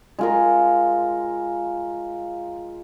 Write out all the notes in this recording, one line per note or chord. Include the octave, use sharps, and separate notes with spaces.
G#3 F4 A#4